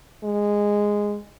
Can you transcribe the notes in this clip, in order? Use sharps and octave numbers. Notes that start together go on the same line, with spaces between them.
G#3